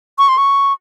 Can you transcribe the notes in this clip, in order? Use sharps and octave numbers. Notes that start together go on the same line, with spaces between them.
C#6
C6
C#6